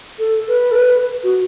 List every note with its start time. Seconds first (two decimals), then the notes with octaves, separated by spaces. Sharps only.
0.19 A4
0.48 B4
0.71 A4
0.77 B4
1.24 F#4